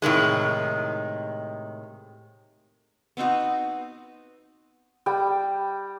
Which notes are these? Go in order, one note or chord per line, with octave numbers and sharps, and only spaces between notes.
A2 C3 D#3 G#3
B3 C4 D#4 F#4
G3 G5